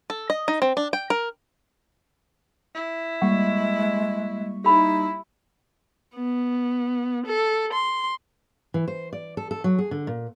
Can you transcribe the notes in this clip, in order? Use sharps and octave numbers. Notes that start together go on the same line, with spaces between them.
A4
D#5
D#4
C4
D4
G5
A#4
E4
G3 G#3 A#3 F#5 C#6
D#4 E4 G4 B5
B3
A4
C6
E3
C5
D5
A4
A4
F#3
G#4
D3
A#2